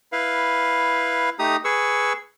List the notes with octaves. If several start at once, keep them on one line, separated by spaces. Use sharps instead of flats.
E4 B4 F5
A3 D#4 G4 A#5 D#6
G#4 B4 C#6 E6